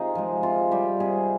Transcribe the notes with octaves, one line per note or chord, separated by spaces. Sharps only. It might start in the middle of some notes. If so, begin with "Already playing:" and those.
Already playing: C3 D#4 F4 G#4
F3 G#3
C3 F4
G3 G4
C3 G#4